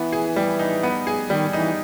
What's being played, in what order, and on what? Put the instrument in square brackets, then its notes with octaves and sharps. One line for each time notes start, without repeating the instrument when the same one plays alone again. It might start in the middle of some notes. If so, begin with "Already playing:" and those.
Already playing: [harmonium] E3 [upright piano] B3
[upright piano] G#4
G3
D#4
B3
G#4
[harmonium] D#3 [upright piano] G3
[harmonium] E3 [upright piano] D#4